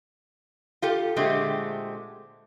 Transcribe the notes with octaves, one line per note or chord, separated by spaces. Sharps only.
F4 G4 A4
A#2 D3 G#3 A3 C4 G4